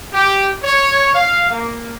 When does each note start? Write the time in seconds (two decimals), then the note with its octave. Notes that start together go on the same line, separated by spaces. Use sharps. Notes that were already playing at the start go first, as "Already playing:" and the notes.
0.12 G4
0.63 C#5
1.14 F5
1.49 A#3